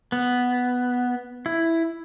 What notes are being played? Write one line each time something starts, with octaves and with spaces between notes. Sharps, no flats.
B3
E4